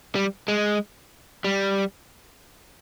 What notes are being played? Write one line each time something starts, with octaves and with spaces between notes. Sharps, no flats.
G3
G#3
G3